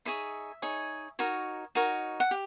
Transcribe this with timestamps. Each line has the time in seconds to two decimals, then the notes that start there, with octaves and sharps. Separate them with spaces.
0.05 D#4 G#4 C#5 E5
0.62 D#4 G#4 C#5
1.19 D#4 F#4 A#4 C#5
1.75 D#4 F#4 A#4 C#5
2.20 F#5
2.31 G4